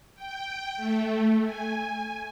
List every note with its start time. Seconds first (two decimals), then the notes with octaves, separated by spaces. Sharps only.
0.15 G5
0.77 A3
1.43 G#5